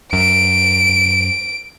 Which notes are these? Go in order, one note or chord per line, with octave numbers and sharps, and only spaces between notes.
F#2 D7